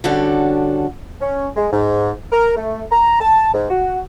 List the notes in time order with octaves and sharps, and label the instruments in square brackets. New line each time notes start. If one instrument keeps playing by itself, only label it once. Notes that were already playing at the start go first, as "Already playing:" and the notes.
[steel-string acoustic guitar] D3 G3 C#4 D4 F#4 A4
[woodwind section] C#4
G#3
G#2
A#4
A3
A#5
A5
G#2
F#4